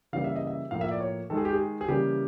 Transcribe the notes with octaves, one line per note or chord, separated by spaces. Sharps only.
C#3 E3 G3 A#3 F5
E5
D#5
E5
A2 F3 A#3 F5
E5
D5
C#5
D#3 G#3 A4
G#4
G4
G#4
G#4
C#3 E3 G3 A#3 G4